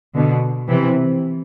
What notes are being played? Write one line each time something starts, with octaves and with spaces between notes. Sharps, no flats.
B2 D3
C3 E3